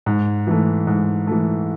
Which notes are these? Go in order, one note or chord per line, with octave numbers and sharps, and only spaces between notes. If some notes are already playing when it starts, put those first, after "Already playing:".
G#2
E3 A3
G#2
E3 A3